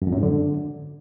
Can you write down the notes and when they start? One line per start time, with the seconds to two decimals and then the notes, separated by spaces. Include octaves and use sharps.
0.02 F#2
0.07 F2
0.12 F#2
0.18 G#2
0.23 D3